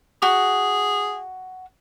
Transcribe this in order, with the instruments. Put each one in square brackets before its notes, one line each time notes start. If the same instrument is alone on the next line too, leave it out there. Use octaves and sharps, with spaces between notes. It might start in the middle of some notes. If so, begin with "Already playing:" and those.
[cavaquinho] F#4 [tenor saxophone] G#4